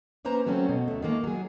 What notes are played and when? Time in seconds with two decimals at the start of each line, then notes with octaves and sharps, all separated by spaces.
0.25 A#3 C#4 B4 C5 A#5
0.47 F#3 A3 C4 C#4
0.69 B2
0.88 D2 A3
1.02 D#3 G#3 A#3
1.24 F#3 G#4